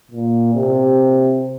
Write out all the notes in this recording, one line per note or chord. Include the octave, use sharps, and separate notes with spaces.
A#2
C3